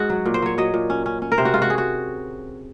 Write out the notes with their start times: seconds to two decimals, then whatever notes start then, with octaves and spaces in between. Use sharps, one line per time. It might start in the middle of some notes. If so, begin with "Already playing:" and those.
Already playing: G#2 F#4 G#4
0.10 F#3
0.26 A#2
0.34 C5
0.42 F#3 C#5
0.58 F#3 D#5
0.74 A#2
0.90 C#4
1.06 C#4
1.22 C#4
1.32 A#4
1.38 C3 C5
1.45 F#4
1.54 G#2 F4
1.62 F#4
1.70 G#4
1.78 F#4